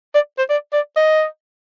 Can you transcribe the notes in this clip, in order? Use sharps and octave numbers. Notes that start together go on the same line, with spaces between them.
D5
C5
D5
D5
D#5